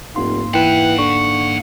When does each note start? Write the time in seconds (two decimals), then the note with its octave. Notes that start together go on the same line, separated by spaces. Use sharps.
0.16 F1 G#2 A#3 C6
0.54 E3 B4 E5 F#5 G5
0.99 D3 C#6